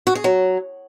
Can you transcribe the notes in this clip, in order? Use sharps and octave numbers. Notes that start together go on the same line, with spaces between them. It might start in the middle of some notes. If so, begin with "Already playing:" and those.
F#4
G#4
F#3